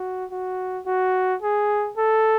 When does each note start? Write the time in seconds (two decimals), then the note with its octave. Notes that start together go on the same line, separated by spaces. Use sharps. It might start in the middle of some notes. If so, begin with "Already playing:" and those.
Already playing: F#4
0.31 F#4
0.86 F#4
1.42 G#4
1.97 A4